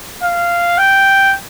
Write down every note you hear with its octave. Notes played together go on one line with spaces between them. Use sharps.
F5
G5